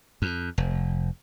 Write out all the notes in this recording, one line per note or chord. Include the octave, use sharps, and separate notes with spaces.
F2
F1